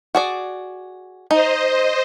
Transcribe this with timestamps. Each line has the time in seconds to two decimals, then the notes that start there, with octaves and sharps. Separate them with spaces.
0.15 F#4 G#4 D5
1.31 D#4 C5 D#5